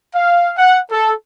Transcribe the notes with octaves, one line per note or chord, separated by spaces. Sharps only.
F5
F#5
A4